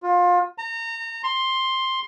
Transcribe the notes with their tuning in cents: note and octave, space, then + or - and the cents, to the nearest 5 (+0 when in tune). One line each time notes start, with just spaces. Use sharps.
F4 +25
A#5 -30
C6 +10